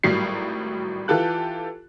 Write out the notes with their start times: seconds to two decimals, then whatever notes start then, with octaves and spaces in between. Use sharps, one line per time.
0.04 G#1 A2 F#3 G3 C7
1.08 E3 F4 G4 A4 F#6